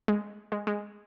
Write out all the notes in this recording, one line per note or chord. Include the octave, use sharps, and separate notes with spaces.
G#3
G#3
G#3